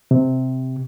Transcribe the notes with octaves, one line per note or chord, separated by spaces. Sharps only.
C3